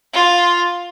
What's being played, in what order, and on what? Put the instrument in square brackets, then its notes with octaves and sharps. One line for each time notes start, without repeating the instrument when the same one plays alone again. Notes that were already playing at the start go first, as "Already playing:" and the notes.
[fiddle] F4